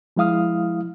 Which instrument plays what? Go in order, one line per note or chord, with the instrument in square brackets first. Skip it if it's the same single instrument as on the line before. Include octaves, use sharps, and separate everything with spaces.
[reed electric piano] F3 G#3 E4 F5 D#6 F6